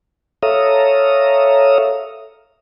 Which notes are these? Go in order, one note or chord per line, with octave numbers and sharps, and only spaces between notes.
A4 C#5 E5 F5 A#5 D#6